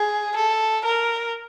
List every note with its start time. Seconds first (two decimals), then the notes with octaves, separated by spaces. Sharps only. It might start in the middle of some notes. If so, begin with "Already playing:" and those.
Already playing: G#4
0.36 A4
0.85 A#4